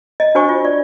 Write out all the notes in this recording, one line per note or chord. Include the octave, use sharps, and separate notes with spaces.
D#5
D4 F#4 C5 G#5 C#6
F4
D5